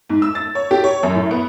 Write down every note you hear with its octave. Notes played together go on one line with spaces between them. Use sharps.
G#2
E6
A6
C#5
G4
C#5
F#2
A2
B3